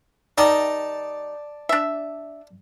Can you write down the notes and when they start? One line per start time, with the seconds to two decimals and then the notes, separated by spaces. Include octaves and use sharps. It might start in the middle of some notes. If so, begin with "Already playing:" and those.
0.38 D#3 G3 D#4 D5 A5 D6
1.69 D4 E5